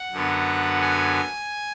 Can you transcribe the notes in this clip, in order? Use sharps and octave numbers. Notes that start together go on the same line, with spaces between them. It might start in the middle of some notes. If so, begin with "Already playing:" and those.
Already playing: F#5
F#2 D3 F#3 B3
G#5